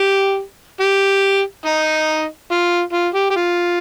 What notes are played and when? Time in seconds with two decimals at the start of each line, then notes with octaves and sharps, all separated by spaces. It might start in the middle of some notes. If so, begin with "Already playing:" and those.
Already playing: G4
0.80 G4
1.66 D#4
2.51 F4
2.93 F4
3.14 G4
3.30 G4
3.36 F4